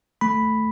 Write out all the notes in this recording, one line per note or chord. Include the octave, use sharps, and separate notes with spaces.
A3 B5